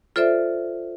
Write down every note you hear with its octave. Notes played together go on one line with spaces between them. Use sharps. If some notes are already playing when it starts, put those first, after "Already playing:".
F4 A4 C5 D5 E5